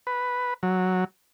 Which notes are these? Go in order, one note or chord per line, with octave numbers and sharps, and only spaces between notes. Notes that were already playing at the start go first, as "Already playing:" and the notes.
B4
F#3